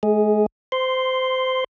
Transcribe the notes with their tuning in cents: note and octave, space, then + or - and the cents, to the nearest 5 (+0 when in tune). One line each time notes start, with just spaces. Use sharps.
G#3 +40 G#4 +0
C5 -20 C6 +0